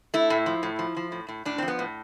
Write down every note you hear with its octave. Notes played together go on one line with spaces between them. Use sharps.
A3 E4
A2
F3
A2
F3
F3
A2
A2
A2 D4
C4
F3
B3
A2